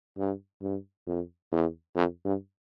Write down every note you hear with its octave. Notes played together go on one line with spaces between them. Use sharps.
G2
G2
F2
E2
F2
G2